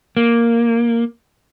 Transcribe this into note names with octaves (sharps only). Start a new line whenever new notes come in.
A#3